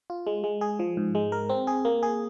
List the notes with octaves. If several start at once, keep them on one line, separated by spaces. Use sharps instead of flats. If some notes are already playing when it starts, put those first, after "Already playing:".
F4
G#3
G#3
G#4
F3
G#2
G#3
A#4
C4
G#4
A#3
G#4